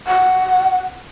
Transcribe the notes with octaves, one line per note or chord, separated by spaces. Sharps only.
F#5